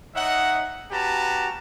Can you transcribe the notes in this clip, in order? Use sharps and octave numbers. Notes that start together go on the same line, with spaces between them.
D#4 C#5 D#5 E5 F#5
C#4 F#4 G4 B4 A5 A#5